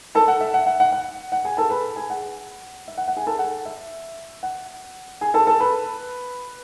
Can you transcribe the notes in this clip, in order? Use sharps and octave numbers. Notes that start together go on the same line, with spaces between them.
A4 A5
F#5
E5
F#5
F#5
F#5
F#5
F#5
G#4 G#5
A4 A5
B4 B5
G#4 G#5
F#5
E5
F#5
F#5
G#4 G#5
A4 A5
F#5
E5
F#5
G#4 G#5
A4 A5
A4 A5
B4 B5